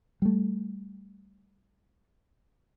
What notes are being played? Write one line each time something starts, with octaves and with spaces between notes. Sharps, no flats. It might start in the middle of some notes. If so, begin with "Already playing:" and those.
G3 A3